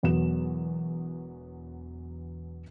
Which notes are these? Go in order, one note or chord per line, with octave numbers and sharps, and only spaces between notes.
E1 E2 F#3 B3 E7